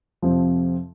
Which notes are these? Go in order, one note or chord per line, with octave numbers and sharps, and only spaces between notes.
F2 C3 F3 C4